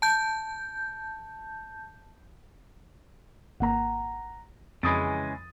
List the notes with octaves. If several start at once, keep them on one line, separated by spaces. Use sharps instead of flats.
A5 G6
G#1 A#3 F#5 A#5
F2 C#3 E3 G#3 B5 D#6 A6